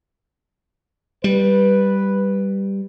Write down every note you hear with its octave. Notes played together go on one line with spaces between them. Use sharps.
G3 B4